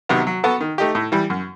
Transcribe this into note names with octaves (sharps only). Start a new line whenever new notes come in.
C3 D#3 F#3 B3
F#3
B3 F#4 A4
D#3
A3 D#4 G4
A2
E3 G3
F#2